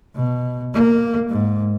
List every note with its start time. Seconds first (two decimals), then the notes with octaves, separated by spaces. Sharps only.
0.16 B2
0.74 A#3
1.29 G#2